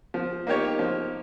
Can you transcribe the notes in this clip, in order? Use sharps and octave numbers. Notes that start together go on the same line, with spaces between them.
F3
A#3 D#4 G4 C#5
F3